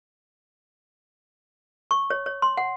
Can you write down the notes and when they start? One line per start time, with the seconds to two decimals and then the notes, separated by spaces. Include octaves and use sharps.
1.91 C#6
2.10 C#5
2.26 C#5
2.42 C6
2.57 F#5